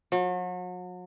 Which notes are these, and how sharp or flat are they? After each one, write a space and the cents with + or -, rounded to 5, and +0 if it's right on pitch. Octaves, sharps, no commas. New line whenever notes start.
F#3 -40